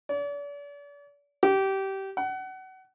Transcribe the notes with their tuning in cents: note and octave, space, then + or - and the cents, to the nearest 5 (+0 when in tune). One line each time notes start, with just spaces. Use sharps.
D5 -40
G4 -20
F#5 +30